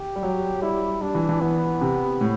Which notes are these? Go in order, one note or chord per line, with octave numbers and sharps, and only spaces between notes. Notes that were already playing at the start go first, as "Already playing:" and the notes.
Already playing: G4
G3
F#3
G3 E4
G3 D4
E3
E3
E3 B3
C3
A2